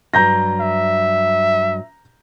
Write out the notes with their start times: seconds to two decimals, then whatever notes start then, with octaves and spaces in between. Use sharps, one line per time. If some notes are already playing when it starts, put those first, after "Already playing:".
0.14 G2 F#3 A#5 G6 A#6
0.61 E5